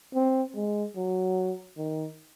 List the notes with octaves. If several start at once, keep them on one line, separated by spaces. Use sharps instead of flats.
C4
G#3
F#3
D#3